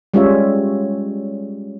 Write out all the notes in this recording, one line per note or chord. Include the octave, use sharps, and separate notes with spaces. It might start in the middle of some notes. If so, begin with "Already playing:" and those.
G3 G#3 C#4 F4 C#5 E5